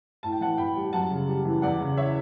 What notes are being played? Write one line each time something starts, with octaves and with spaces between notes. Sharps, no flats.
A2 A5
G5
E3 F#5 A5
A2 G5 B5
G3
F#2 F#5 A5
C#3
G3
E3
E2 D5 F#5
C#3
C#5 E5